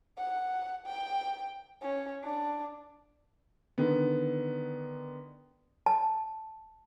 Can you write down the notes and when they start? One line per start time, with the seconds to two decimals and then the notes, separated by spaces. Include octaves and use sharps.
0.18 F#5
0.86 G5
1.82 C#4
2.24 D4
3.78 D3 D#3 B3
5.86 A5